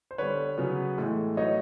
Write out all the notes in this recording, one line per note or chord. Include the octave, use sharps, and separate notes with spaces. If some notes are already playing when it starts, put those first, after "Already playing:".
C5
D3 G3 B3 B4 C#5
C#3 F#3 B3
A2 E3 G#3
A2 F#3 B3 D#4 C#5 D#5